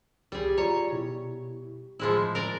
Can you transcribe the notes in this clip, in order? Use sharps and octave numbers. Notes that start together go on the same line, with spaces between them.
C2 G3 G4 G#4
F4 C#5 D5 A#5
B2 E4
A2 F3 G#3 E4
A#4 D5